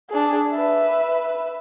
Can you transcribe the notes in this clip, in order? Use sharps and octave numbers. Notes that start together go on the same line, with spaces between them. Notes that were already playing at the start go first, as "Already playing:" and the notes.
D4 G#4
B4 E5